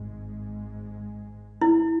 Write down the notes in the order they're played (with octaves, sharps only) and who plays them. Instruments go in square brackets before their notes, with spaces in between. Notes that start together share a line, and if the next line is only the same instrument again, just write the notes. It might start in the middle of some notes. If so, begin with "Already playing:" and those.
Already playing: [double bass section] G#1 G#2 G#3
[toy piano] E4